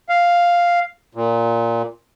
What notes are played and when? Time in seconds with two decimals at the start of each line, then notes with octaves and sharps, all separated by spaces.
0.09 F5
1.15 A#2